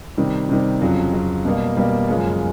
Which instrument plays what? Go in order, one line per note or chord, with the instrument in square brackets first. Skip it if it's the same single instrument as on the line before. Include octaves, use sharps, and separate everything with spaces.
[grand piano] C3 D#3 G3
C3 D#3 G3
F2 C#3 F#3
F2 C#3 F#3
B2 G3 A#3
B2 G3 A#3
F#2 C#3 F3 G#3 C#4